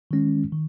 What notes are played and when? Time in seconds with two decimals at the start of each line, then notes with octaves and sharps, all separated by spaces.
0.11 D#3 G#3 C#4
0.53 D#3